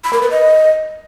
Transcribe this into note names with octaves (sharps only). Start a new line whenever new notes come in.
B5
A#4
B4
D#5